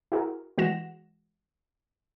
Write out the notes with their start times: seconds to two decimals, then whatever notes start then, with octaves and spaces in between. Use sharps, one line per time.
0.12 E4 F#4 G#4 A#4
0.58 E3 G#3 F#4 F#5 A#6 E7